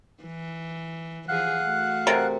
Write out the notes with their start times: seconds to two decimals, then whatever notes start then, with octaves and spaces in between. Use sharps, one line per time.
0.23 E3
1.28 E3 F3 G#4 F5 F#5 F#6
1.64 A3 F#4
2.07 C3 A4 A#4